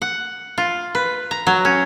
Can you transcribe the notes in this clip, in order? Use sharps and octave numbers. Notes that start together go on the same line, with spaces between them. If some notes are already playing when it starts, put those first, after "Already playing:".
F#5
F4
B4
A#5
F#3
C#4